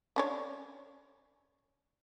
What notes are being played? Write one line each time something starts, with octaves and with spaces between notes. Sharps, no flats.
C#4 D4 C#5